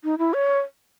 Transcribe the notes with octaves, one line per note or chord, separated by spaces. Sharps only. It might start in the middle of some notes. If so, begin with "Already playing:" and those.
D#4
E4
C#5